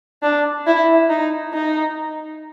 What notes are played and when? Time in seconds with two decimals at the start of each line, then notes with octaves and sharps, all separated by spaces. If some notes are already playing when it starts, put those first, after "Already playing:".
0.23 D4
0.66 E4
1.09 D#4
1.53 D#4